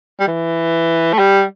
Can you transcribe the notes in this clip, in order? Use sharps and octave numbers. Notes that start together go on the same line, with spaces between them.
G3
E3
A3
G3